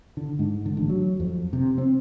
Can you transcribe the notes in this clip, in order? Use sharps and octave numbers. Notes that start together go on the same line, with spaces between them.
D3
G#2
D3
A1
F#3
F2
C3
C4